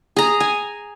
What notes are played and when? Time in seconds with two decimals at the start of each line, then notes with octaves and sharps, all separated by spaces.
0.16 G#4 A#5
0.40 G#5